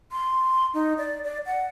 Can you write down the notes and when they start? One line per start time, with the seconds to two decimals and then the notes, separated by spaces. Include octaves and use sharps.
0.12 C6
0.74 D#4
0.98 D5
1.24 D5
1.46 F#5